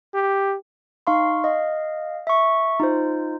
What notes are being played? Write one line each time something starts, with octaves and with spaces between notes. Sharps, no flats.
G4
D#4 F5 C6 C#6
D#5 F5
E5 C#6
D#4 F4 C5